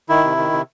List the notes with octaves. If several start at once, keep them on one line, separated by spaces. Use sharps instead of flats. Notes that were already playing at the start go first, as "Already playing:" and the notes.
D#3 E4
C3
D#3
C3